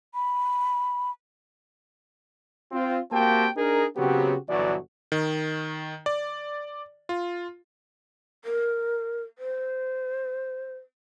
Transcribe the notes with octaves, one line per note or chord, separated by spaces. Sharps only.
B5
C4 F4
A#3 C4 F#4 G4 G5 A5
D4 D#4 G#4 A#4
C#3 F#3 B3 C4 F#4 G4
G1 B2 E3 F#3 F#4 D5
D#3
D5
F4
A#4
C5